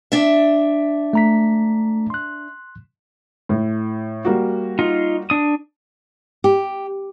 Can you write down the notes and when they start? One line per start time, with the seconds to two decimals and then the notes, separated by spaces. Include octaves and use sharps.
0.12 D4 E5
1.13 A3 A#5 B6
2.10 C6 F#6
3.49 A2
4.25 G3 A#3 F#4
4.79 D#4 F4
5.30 D4 D#6
6.44 G4